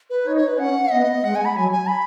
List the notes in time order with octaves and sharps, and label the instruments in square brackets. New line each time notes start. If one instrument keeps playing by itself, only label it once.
[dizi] B4
[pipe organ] D#4 [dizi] C#5
[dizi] C#5
B4
[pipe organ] C#4 [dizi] F#5
[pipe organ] B3 [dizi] D#5
[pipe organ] G#3 [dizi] F#5
[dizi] G#5
B5
[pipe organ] F#3 [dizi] G#5
[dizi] G#5
B5